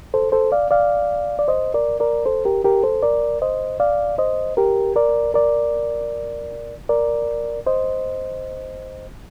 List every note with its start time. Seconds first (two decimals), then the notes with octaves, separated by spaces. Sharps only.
0.14 A4 C5
0.32 A4 C5
0.52 D5 F5
0.71 D5 F5
1.39 D5
1.48 C5 D#5
1.74 A#4 D5
2.00 A#4 D5
2.26 A4 C5
2.45 G4 A#4
2.64 G4 A#4
2.83 A4 C5
3.03 A#4 D5
3.42 C5 D#5
3.80 D5 F5
4.18 C5 D#5
4.57 G4 A#4
4.96 A#4 D5
5.34 A#4 D5
6.89 A#4 D5
7.67 C5 D#5